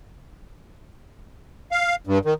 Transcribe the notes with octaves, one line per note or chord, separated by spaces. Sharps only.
F5
G2
D#3